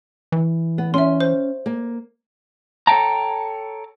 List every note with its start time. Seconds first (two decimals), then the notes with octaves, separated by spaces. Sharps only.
0.32 E3
0.78 B3
0.94 C#4 E5 C6
1.21 C5
1.66 A#3
2.87 A4 C#5 E5 G5 A5 A#5